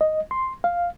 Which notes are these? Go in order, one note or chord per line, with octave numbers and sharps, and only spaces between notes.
D#5
C6
F5